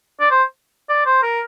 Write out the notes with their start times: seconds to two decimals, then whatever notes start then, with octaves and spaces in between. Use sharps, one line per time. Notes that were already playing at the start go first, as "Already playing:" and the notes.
0.20 D5
0.31 C5
0.89 D5
1.06 C5
1.23 A#4